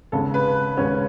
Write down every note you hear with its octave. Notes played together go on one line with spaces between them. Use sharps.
D#2 C#3 G#3 B3 A4
B4
D#2 C#3 G#3 B3 C#4